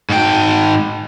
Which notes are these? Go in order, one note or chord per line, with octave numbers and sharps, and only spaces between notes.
G#2 G5